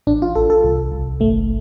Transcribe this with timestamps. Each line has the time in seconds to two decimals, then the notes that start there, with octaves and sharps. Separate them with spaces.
0.07 A1 D4
0.22 F4
0.35 A1 A4
0.50 A4
0.63 C2
0.92 C2
1.20 G1 A3